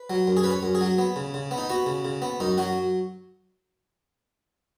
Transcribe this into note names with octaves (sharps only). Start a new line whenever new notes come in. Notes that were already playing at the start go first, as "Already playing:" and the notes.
Already playing: B4
F#3
F#2
G#4
C#4 B4
C#5
F#2
G#4
F#3
B3
C#3
C#3
B3
D#4
B3 F#4
C#3
C#3
B3
F#2 D#4
F#3 F#4